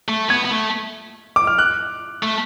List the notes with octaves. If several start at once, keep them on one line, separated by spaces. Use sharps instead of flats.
A3
B3 G#6
B3
A3
D6
F6
F#6
A3